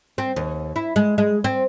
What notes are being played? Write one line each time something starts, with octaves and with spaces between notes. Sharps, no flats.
C4
D#2
E4
G#3
G#3
C4